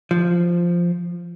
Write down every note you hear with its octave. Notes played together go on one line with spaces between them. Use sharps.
F3